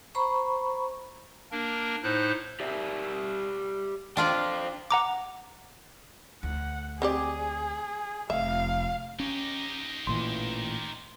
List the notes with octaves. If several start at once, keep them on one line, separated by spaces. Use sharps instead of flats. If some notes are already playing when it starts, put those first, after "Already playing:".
C5 A#5 B5 C#6
A#3 D4 A#4
A2 D#4 C5 F#6
G4 D5 E5
D4 F4 C5 D5 F5 G5
F#5 A#5 D6
D2 F#5
C4 G4 G#4 D5
F1 E5 F5
C#4 D#4 G4
A1 A#2 E3 C6